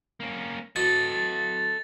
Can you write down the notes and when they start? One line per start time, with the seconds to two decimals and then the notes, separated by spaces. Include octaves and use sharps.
0.20 A#3 C#4
0.76 E3 F#4 A4 D#5 C#6 A6